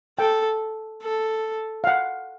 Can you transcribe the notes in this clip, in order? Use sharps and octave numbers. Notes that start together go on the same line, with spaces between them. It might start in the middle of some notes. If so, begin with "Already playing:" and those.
A4 G5
A4
F5
F#5